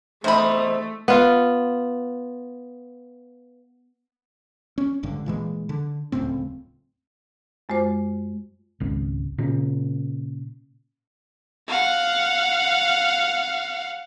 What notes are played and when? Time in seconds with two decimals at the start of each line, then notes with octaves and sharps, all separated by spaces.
0.24 E2 C3 A3 D#4 C5 B5
1.08 B3 F4
4.78 C#4
5.03 G#1 G2 D3
5.26 A#2 E3 G#3
5.69 D3
6.12 D1 C#2 A2 C4
7.69 F#2 G#3 F4 C5 D6
8.80 G#1 C#2
9.38 A#2 C#3
11.68 F5 F#5